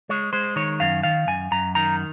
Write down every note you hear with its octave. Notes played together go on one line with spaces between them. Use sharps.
G#3 C#5
G#3 C5
D#3 C#5
F#2 F5
D#3 F5
F#2 G#5
F#2 A#5
D#3 A#5